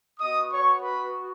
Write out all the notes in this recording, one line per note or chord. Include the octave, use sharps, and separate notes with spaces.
B3 F#4 D#5 D#6
C#5 C#6
B4 B5